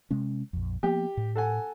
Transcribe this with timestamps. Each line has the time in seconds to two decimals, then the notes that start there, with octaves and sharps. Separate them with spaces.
0.11 C3 G#3 C#4
0.53 A#1 F2
0.83 F3 A#3 B3 G4
1.17 A2
1.35 A4 F#5 G#5